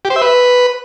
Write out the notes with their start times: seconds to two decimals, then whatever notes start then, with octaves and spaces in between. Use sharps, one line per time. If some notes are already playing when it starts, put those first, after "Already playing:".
0.05 G4
0.10 C5
0.16 E5
0.22 B4